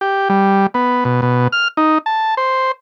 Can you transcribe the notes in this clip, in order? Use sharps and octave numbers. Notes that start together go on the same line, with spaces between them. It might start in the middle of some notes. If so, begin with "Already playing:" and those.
G4
G3
B3
B2
B2
F6
D#4
A5
C5